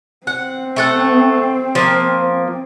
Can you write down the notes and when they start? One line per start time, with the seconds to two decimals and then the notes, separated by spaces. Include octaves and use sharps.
0.27 C4 F#5
0.76 A3 A4 F#5
1.75 F3 A#3